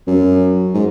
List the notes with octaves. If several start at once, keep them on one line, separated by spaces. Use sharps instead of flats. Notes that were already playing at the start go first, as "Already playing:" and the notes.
F#2
G#2